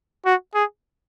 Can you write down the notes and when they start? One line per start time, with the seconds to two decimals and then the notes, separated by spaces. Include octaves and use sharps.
0.26 F#4
0.55 G#4